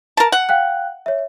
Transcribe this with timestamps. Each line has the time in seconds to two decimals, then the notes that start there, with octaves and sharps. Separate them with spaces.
0.17 A#4 A5
0.32 F#5
0.49 F5 G5 F#6
1.06 C#5 E5